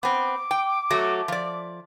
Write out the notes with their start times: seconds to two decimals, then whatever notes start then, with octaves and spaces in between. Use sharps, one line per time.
0.03 B3 C4 D6
0.51 G5
0.90 F#3 A3 F#4
1.28 F3 D5